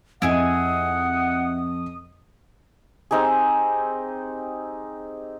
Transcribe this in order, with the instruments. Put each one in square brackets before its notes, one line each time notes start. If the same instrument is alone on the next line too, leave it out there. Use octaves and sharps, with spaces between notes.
[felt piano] F2 D#5 [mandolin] E4 G#4 G#5 [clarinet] F#5 [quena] D#6
[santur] C4 D#4 G4 G#4